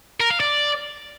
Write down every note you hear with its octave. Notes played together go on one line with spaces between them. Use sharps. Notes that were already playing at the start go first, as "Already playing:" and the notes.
A#4
F5
D5